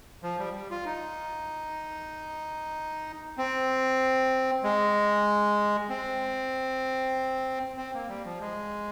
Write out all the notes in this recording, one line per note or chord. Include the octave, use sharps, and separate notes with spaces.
F3
G3
G3
F4
D#4
C4
G#3
C4
C4
A#3
G3
F3
G#3